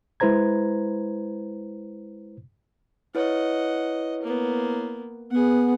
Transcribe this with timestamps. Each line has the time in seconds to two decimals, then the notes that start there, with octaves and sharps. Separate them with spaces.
0.20 G#3 E4 B4 C5 A#5 G#6
3.15 E4 B4 C#5 D#5 F#5
4.23 A#3 B3
5.31 B3 G#4 F#5